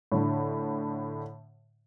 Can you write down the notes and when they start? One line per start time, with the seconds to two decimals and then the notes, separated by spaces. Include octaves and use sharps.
0.12 A2 D3